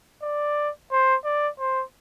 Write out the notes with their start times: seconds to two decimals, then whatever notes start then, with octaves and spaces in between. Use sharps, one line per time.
0.22 D5
0.92 C5
1.25 D5
1.59 C5